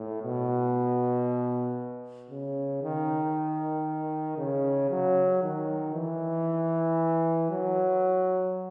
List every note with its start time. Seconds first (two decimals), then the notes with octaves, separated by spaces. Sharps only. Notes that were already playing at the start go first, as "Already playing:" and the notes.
Already playing: A2
0.23 B2
2.31 C#3
2.83 D#3
4.38 C#3
4.91 F#3
5.43 D#3
5.94 E3
7.51 F#3